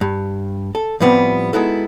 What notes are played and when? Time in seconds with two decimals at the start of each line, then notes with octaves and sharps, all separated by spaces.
0.01 G2
0.75 A4
1.00 A2 F3 G3 B3 C4
1.53 G#3 B3 D#4 E4 F#4 A4